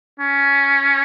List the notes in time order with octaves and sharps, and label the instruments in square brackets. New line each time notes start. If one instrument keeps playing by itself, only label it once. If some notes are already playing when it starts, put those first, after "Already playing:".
[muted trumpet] C#4